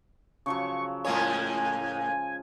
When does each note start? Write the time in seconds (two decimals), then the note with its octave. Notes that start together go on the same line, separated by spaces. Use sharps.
0.46 C#3 F3 F#3 C#6
1.05 A2 F3 G#3 A#3 C#5 G#5